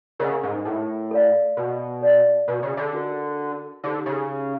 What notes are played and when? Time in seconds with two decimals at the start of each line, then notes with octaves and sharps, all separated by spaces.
0.19 C#3 A#4 D#5 F#5
0.43 G#2
0.65 A2
1.11 A4 D5 F5
1.57 B2
2.01 A4 D5 F5
2.48 B2
2.63 C#3
2.77 D3
2.93 D4 F#4 A#4 D#5
3.83 D3 D#4 G4 C5
4.06 C#3